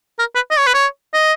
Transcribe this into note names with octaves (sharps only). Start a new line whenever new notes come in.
A#4
B4
D#5
C#5
B4
C#5
D#5